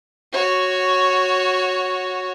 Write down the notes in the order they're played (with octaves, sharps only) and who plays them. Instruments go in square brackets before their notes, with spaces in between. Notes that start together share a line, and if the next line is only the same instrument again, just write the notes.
[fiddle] F#4 C#5